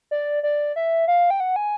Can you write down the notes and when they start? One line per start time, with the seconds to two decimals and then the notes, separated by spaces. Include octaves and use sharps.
0.11 D5
0.43 D5
0.76 E5
1.08 F5
1.30 G5
1.40 F#5
1.56 G#5